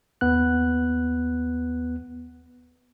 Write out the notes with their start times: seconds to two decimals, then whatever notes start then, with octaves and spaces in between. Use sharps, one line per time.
0.21 D#2 B3 F#6